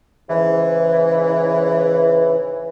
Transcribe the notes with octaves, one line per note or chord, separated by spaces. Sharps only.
G#2 C#3 E3